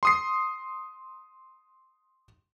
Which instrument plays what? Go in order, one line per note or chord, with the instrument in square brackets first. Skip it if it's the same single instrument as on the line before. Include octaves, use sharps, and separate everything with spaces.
[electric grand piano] C6 D#6 C7